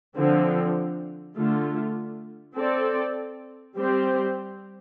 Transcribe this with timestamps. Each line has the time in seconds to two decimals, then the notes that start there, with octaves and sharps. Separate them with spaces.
0.16 D3 F3 C4
1.37 D3 A3 F4
2.56 C4 A4 D5
3.76 G3 C4 G4 C5